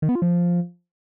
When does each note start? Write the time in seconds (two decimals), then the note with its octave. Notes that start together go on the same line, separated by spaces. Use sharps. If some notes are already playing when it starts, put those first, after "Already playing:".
0.02 D#3
0.09 B3
0.15 F4
0.22 F3